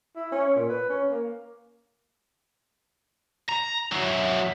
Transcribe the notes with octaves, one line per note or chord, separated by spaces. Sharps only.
E4
C#4
A#2
B4
C#4
A#3
A#5
F#3 E4